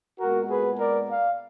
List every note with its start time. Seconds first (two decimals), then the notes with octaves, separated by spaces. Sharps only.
0.20 A#2 G#3 B3 F#4 A#4
0.50 G#4 B4
0.79 A#4 D5
1.08 D5 F5